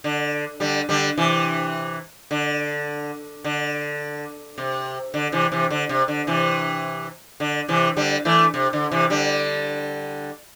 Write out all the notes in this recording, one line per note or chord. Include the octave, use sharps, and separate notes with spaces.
D3
D3 G3
D3 G3
C3 E3
D3
D3
C3
D3
C3 E3
C3 E3
D3
C3
D3
C3 E3
D3
C3 E3
D3 G3
E3 A3
C3
D3
C3 E3
D3 G3